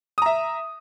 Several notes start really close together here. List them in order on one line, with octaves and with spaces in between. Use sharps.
D#6 A#5 E5